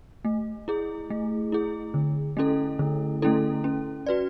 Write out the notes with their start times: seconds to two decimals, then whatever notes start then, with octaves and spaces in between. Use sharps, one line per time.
0.25 A3
0.68 E4 G#4
1.10 A3
1.52 E4 G#4
1.94 D3
2.37 A3 C#4 E4 A4
2.79 D3
3.22 A3 C#4 E4 A4
3.64 C#4
4.07 F#4 B4 D5